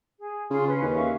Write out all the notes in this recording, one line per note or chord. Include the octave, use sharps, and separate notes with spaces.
G#4
C#3 F4 C6
C#4 B4
D#2
E5 F5 C#6